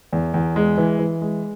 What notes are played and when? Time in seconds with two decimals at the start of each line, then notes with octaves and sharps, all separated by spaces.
0.13 E2
0.34 E2
0.56 G#3
0.78 E3
0.99 E3
1.22 G#3